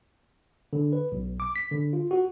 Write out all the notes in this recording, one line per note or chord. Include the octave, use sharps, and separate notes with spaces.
D3
B4
B1
D6
B6
D3
F4
F#4